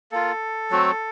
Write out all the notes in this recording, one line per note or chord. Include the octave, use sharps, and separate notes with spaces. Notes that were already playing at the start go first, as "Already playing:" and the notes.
A#3 F4 A4
F#3 A3 C4 F#4